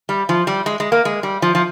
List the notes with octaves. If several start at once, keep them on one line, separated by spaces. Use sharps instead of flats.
G3
F3
G3
G#3
G#3
A#3
G#3
G3
F3
F3